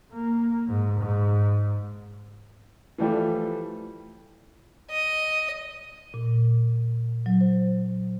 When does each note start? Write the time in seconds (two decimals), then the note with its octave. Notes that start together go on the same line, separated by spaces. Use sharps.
0.12 A#3
0.68 G#2
1.00 G#2
2.98 E3 F3 G3 A3
4.91 D#5
6.14 A#2
7.26 F#3
7.41 C5